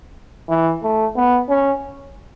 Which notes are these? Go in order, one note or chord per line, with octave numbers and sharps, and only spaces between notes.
E3
A3
B3
C#4